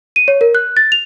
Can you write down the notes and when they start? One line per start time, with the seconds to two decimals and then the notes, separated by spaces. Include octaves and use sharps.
0.16 D#7
0.28 C#5
0.41 A#4
0.55 F#6
0.77 A6
0.92 F7